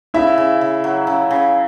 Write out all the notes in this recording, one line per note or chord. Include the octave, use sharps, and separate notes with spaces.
C#3 E4 E5
C#3
C#3
F#3
C#3
C#3